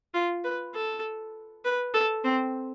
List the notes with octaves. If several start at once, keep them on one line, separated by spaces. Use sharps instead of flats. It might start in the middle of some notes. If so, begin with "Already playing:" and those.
F4
B4
A4
B4
A4
C4